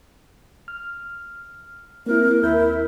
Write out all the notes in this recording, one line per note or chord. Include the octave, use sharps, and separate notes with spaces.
F6
A#3 C4 E4 A#4
D#2 E4 A#4 G6